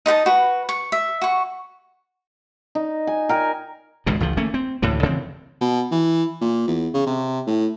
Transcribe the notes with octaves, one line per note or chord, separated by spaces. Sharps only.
D#4 D#5 F#5 A5
F#4 B4
C#6
E5
F#4 C#6
D#4
G#5
A#4 G5 G#5
G#1 C#2 G2 B2
G#1 C#2 F3
A3 A#3 C#4
C4
D2 A2 D3 E3
C#3 E3 B3 C4
B2
E3
A#2
E2
C#3
C3
A2